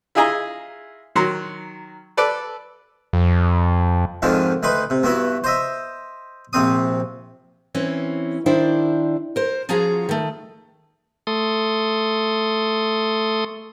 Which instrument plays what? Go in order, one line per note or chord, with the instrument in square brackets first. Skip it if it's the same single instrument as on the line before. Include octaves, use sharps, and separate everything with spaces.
[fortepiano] E4 F4 G#4 D#5 G#5 A#5
D#3 F#3 A#5 C6
A4 B4 D5
[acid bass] F2
[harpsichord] F2 G#2 D3 D#3 F3
D2 D#4 B4 C6
C3
G2 B3 E4 F#4
C5 D#5 E5
A#1 C3 C4 D#6
[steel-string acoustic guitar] E3 C4 C#4
D#3 D4 E4 C5 D5
A#4 C5
F3 C#4 F4 F#4 G#4 A#5
D#3 A3
[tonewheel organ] A3 A4 C6 D#6